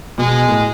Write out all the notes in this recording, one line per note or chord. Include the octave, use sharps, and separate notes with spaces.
B2 G#3
A2